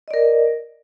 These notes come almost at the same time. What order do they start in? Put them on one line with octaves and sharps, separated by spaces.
D#5 D5 A#4